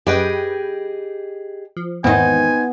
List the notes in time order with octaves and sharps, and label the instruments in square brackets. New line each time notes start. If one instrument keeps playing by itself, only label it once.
[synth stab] F#2 B4 G5 [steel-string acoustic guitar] G4 G#4 D#5
[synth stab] F3
[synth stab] E2 G#2 D#3 [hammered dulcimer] B3 [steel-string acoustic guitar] C4 D#4 [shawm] G#5